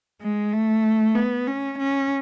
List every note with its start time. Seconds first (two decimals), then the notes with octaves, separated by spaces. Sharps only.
0.22 G#3
0.53 A3
1.15 B3
1.47 C#4
1.79 C#4